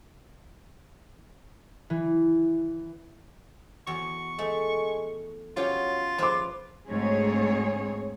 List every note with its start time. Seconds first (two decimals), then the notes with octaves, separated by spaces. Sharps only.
1.90 E3
3.87 E2 F#4 C#6
4.39 G#3 A3
5.57 F#3 C#4 F4 G4 C#5
6.18 F3 B4 F5 C6 D6
6.88 D2 G#2 C4 G#4 C#5